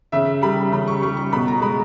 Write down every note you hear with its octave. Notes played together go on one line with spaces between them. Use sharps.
C#3 E5
G3 B5
C#3 B5
C#6
G3 C#6
C#6
B2 B5
A#5
G#3 B5